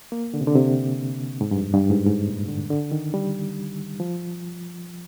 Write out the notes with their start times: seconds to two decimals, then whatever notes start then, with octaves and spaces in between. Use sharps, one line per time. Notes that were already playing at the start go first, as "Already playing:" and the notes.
0.12 A#3
0.34 D3
0.41 C3
0.47 D3
0.55 C3
1.41 G#2
1.51 G2
1.58 F2
1.73 G2
1.90 G#2
2.06 G#2
2.27 A#2
2.48 D3
2.70 D3
2.92 D#3
3.14 G3
4.00 F3